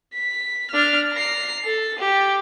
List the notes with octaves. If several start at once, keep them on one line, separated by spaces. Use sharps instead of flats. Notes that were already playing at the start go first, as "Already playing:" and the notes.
B6
D4 F6
A#5 C7
A4
G4